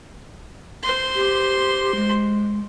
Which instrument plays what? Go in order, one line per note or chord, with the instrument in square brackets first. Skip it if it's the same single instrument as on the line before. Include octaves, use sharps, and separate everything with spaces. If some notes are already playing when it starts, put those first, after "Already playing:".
[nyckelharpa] C5 C6
[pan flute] G4
G#3